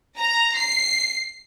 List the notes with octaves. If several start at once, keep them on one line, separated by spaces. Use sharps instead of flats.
A#5
C7